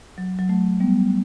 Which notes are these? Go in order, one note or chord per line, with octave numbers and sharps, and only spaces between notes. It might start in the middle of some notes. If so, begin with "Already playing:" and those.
F#3
F#3
F#3 A3
G3 B3